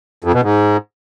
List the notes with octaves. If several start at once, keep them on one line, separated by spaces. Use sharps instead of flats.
F2
B2
G#2